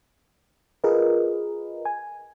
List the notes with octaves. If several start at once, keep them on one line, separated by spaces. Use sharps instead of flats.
F4 G#4 A#4 B4 D#5
G#5